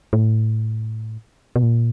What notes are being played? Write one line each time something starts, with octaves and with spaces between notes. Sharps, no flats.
A2
B2
A#2